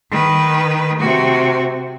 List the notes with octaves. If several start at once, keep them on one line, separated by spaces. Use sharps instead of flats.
D#3 B4
C3 F#4